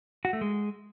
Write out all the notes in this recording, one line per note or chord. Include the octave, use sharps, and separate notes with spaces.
F#4
A3
G#3